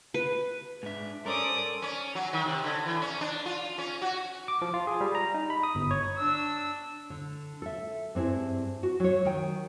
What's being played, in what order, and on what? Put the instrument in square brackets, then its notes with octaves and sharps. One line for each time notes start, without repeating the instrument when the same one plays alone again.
[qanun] B4
[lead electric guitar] G#2 E5 [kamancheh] D4
[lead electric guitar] G2 A#4 [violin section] C#4 C5 [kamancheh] A4 D5 [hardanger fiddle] D6 D#6
[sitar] C#4
F#3
D#3
C3
D3
E3
C#4
D4
F4
C#4
F#4
[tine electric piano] D6
F3
F4
G#4
G3
A#5
D#4
B5
D#6
G1
C#5
[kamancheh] D4 E6
[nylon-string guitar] D3
A4 E5
G2 C4 E4 G#4
F#4
F#3 C#5
D#3 G5